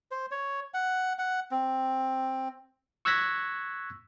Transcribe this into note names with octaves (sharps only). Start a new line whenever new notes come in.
C5
C#5
F#5
F#5
C4
C#6 E6 F#6 G#6 A#6 B6